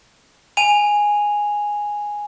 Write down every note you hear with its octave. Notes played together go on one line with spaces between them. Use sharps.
G#5 D#7 F7